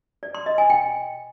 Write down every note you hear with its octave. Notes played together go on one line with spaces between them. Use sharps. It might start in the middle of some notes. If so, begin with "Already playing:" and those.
D5
C6
D#5
G#5
G5